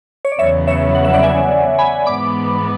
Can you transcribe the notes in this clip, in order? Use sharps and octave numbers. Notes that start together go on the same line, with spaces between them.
C#5
D5
E2 C#3 F#3 B3 C#5 E5
C#5 E5
F#5
E5
D5 F#5
E5 G#5
G#5 B5
G#2 E3 B3 B5 D6